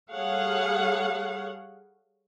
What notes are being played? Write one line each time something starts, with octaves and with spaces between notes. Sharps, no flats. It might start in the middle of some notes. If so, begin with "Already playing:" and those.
G3 G#4 A4 C#5 F5 F#5